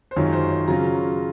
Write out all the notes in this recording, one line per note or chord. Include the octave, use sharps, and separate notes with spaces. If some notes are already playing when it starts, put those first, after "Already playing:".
C5
F#2 D#3 G#3 C#4 F4 C#5
C5
C#5
C#3 F#3 C#4 F4 A#5